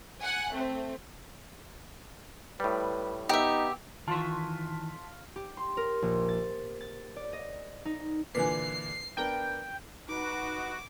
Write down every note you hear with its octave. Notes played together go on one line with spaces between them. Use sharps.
F#5 G#5 F#6
A3 C4
A2 G3 B4
B3 D#4 G4 E5
D#3 E3 F4 A5 C6 C#6 B6
G4
C6
A#4
A#1
A6
A6
D5
D#5
D#4
A#2 D3 E3 B4 G#5 C7
B3 D4 A#4 G5
D#4 F#4 B4 D6